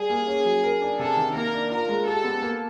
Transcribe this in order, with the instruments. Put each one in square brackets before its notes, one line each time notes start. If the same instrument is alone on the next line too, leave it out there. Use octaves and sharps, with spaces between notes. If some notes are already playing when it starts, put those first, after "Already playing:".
Already playing: [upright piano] G3 [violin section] G#4
[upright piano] A#3
C#4
F#3
A#4
D4
[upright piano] C3 [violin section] A4
[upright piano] D#3
[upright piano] A#3 [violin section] A#4
[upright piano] D4
[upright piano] F4 [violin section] A#4
[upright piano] G#3
[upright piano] G4 [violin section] A4
[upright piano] B3
A#3